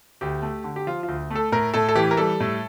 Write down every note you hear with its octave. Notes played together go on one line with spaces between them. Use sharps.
D2 G4
A3
D3
G4
F3 F4
D2 F4
A3 A4
A2 A#4
A2 A4
A4
E3 G4
A#4
G3 A4
A2